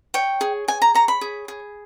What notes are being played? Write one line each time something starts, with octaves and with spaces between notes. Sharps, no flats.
C#5 G5
G#4
G#4 G#5
A#5
C#5 A#5
B5
G#4
G#4